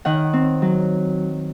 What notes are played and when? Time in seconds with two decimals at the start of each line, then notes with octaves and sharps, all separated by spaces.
0.05 D#3 F#5
0.33 C4
0.62 F#3